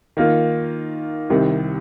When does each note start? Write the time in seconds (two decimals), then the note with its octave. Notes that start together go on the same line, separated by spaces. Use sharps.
0.17 D#3 A#3 F4
1.30 C2 C3 D#3